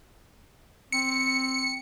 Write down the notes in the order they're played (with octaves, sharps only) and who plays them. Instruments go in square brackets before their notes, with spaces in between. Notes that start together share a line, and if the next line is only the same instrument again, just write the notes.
[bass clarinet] C4 [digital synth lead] C#7